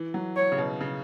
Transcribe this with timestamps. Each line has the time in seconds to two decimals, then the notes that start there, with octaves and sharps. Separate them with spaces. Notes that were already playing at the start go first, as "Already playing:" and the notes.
Already playing: E3
0.14 F#3
0.36 C#5
0.52 C#3
0.58 B2
0.81 C#3